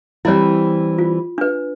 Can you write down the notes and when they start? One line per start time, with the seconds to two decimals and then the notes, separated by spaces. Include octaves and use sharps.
0.25 E3 G3 C4 E4 C#5
0.98 F4
1.38 D4 B4